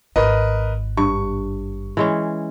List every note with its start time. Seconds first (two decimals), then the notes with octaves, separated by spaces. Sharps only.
0.16 G#1 A#4 B4 D#5
0.97 G2 C#6
1.97 E3 G#3 C#4